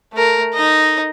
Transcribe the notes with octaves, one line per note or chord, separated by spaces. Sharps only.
A3 A#4
D#4 D#5